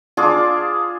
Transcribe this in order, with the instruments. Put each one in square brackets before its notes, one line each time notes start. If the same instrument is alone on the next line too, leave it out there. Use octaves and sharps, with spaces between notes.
[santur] D4 F4 G#4 D6